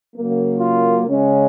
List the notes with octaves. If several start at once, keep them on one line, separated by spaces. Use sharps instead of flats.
C#3 F#3 A#3
F4
C#3 G#3 C#4